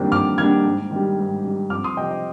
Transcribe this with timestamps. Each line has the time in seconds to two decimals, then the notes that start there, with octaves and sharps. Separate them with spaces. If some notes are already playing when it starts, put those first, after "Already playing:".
Already playing: F2 D#3 G3 A#3 D4
0.12 F2 D6 F6
0.38 D#3 G3 A#3 D4 F6 G#6
0.65 G#2
0.91 D#3 G3
1.18 G#2
1.44 D#3 G3
1.70 F2 D6 F6
1.84 C6 D#6
1.97 C3 F3 D#5 G5
2.11 D#5